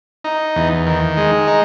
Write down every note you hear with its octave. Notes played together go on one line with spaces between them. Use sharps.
D#4
E2
D#3
G#3
D#4